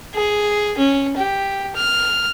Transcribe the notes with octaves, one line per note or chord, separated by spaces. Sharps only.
G#4
C#4
G4
F6